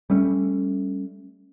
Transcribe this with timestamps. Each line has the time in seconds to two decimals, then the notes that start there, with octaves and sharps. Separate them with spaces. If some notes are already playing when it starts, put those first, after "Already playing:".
0.10 G3 A3 C#4